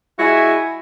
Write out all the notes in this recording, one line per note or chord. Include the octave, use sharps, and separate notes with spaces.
G#3 E4 F#4 E5 G#5